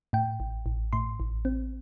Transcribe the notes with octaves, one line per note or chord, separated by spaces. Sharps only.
A2 G5
A1
A1
A2 C6
A1
C4